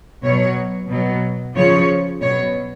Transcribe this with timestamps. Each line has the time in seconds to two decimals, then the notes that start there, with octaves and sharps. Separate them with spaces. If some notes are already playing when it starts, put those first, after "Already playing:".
0.24 B2 F#3 C#5
0.91 B2 F#3
1.55 C#3 F3 C#5
2.20 B2 F#3 C#5